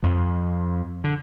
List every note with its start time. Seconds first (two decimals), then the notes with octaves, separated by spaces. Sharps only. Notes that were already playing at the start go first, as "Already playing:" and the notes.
0.03 F2 F3
1.04 D3